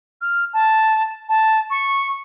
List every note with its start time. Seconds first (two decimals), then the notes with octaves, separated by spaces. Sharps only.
0.21 F6
0.53 A5
1.29 A5
1.70 C#6